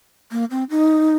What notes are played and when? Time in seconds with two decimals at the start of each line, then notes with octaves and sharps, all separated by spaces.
0.32 A#3
0.51 C4
0.70 D#4